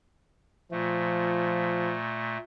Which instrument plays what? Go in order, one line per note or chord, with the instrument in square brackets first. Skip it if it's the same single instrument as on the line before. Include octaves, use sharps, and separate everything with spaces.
[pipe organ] A#2 A3 [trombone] F3